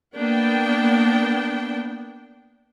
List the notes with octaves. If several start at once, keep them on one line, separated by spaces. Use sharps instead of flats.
A#3 B3 D4 G5